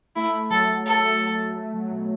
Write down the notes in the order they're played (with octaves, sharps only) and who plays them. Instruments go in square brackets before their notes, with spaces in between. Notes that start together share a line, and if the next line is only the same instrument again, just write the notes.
[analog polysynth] A3 [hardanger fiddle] E4
[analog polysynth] F#3 [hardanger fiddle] A4
[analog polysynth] F#3 [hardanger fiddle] A4
[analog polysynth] A3
F#3
B2